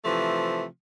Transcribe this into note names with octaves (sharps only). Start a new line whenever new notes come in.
C3 E3 F3 A3